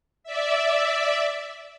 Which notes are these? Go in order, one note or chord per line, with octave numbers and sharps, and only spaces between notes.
D5 E5